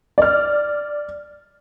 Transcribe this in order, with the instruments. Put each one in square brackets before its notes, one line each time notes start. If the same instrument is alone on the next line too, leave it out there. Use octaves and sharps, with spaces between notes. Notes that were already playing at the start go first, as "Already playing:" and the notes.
[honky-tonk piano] D5 F6